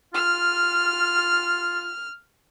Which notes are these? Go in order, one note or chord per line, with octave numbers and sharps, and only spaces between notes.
F4 F6